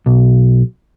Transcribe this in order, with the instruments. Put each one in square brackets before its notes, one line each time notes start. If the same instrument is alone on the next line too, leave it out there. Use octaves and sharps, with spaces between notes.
[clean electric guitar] B1